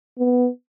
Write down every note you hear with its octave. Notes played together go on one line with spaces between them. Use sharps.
B3